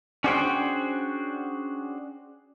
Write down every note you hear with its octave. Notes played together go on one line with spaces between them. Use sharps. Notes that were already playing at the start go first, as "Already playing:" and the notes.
C#4 D4 F#4 G#4 C5 G5